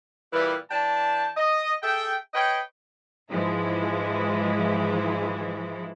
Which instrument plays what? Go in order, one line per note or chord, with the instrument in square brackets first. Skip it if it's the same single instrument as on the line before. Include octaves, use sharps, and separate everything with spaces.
[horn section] A#2 E3 G3
E3 D4 G5 A5
D#5
G#4 A4 E5 G5
B4 C#5 D#5 G5
[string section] G#2 E3 F3 G#3 E4